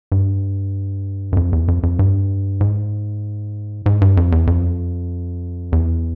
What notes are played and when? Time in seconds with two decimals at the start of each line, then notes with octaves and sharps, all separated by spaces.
0.12 G2
1.32 F#2
1.37 F2
1.53 E2
1.68 F2
1.83 F2
1.99 G2
2.61 G#2
3.86 G#2
4.01 G2
4.17 F2
4.32 E2
4.47 F2
5.72 E2